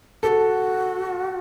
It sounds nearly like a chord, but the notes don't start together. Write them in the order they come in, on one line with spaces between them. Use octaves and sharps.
G4 A4 F#4